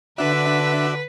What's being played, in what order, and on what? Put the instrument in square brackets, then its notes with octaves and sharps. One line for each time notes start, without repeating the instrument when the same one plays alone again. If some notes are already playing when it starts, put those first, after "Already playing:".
[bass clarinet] D3 [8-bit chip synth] D4 E5 [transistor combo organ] F#4 D5 [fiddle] B4